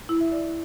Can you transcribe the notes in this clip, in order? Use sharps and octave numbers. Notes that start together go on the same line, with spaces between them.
E4
E5
D5